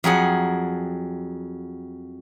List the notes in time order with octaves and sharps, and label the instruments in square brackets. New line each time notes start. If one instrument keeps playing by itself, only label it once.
[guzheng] F2 F#3 G#4 F#5